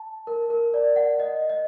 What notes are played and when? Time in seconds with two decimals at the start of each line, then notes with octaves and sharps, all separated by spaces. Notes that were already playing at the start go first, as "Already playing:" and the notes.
Already playing: A5
0.27 A#4
0.50 A#4
0.74 D5
0.96 F#5
1.20 D#5
1.49 D#5